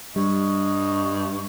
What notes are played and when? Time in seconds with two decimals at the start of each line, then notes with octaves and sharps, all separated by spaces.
0.16 G2 G3 D#5 C#6